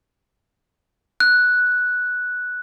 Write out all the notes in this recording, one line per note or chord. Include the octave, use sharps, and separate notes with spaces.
F#6